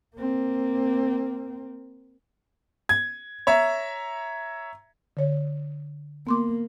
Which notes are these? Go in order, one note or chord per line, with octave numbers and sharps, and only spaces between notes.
A#3 C4
G#6
C#5 E5 A#5
D3 C#5
A#3 B3 C6 D6